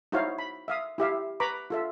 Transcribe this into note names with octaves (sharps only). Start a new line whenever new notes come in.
D#4 E4 F#4 C5 C#5 F5
B5
E5 F5 D#6
E4 G4 E5 F5
B4 A#5 B5 C#6 D6
F4 A4 E5